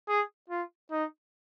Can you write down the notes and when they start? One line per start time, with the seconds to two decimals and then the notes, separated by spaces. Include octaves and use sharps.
0.09 G#4
0.49 F4
0.91 D#4